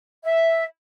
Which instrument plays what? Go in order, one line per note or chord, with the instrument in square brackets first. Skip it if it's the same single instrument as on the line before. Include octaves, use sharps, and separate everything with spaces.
[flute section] E5